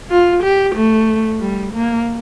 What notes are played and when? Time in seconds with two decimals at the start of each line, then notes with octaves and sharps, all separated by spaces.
0.10 F4
0.43 G4
0.75 A3
1.41 G3
1.74 A#3